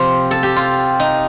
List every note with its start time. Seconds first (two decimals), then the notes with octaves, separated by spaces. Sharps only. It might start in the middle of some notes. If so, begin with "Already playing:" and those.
Already playing: C3 F3 C4 F4
0.31 A4
0.43 G4
0.56 F4
1.00 D#4